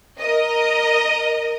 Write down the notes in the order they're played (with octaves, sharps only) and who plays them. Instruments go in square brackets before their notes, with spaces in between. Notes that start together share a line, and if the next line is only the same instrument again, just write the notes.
[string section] A#4 D#5